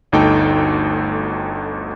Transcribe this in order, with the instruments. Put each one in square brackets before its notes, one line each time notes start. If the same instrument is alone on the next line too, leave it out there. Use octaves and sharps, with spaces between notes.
[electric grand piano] G1 D2 D#4 A4 G5